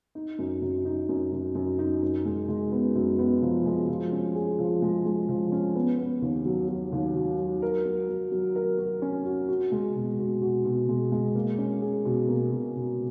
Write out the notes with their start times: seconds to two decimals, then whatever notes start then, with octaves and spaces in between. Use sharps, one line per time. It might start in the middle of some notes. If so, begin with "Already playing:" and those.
0.15 D#4
0.39 F#2
0.62 F#2
0.85 D#4
1.09 F#2
1.32 F#2
1.55 F#2
1.79 D#4
2.03 F#2
2.25 G#3
2.48 G#3
2.72 B3
2.95 F#2
3.19 B3
3.42 F3
3.65 G#3
3.89 F3
4.12 C#4
4.35 G#4
4.59 F3
4.82 G#3
5.05 G#3
5.29 F3
5.52 C#4
5.75 B3
5.98 B3
6.22 D#2
6.45 F#3
6.68 F#3
6.92 D#2
7.15 F#3
7.39 F#3
7.62 A#4
7.85 F#3
8.09 F#3
8.32 F#3
8.55 A#4
8.78 F#4
9.02 C#4
9.25 F#4
9.48 F#4
9.72 G#3
9.95 B2
10.19 B2
10.42 F#4
10.65 B2
10.89 G#3
11.12 G#3
11.35 A#3
11.58 C#4
11.82 G#4
12.05 B2
12.28 A#3
12.52 B2
12.75 B2